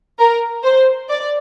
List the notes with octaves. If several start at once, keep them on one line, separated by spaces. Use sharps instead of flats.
A#4
C5
D5